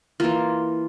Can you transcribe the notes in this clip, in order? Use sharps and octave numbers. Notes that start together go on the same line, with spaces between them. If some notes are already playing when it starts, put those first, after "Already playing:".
E3 A#3 F4